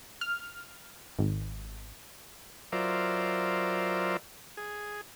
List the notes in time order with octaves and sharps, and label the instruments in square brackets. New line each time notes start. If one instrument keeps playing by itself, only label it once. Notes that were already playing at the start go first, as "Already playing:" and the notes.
[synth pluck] F6
G#1
[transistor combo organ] F#3 F4 A#4 C5 D5 E5
G#4